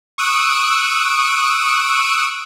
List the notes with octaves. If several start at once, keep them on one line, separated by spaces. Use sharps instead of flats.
C#6 D#6 E6 F#6 D7